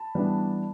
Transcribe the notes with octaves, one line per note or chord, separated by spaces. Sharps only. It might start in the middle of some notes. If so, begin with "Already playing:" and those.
Already playing: A5 B5
E3 G3 B3 D4